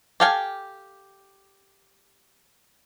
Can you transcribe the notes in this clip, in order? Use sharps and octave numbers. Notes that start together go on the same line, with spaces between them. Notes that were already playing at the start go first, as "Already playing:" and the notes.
G4 A4 F5 G5 G#5